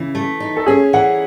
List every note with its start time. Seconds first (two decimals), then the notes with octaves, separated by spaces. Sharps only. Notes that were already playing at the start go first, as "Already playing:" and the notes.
Already playing: C#3 E3
0.15 A3
0.40 D#4
0.57 A4
0.66 C#4 G#4
0.93 E3 F#5